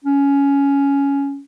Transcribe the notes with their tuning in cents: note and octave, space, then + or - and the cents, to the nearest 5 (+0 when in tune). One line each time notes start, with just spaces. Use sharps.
C#4 +10